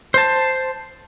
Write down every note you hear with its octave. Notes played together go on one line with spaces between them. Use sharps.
C5 A5